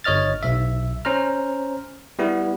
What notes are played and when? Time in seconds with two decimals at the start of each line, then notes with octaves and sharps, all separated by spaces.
0.04 G1 C#5 D#5 F6 A6
0.43 B1 E5
1.05 C#4 C5 A#5 F6
2.19 G3 B3 E4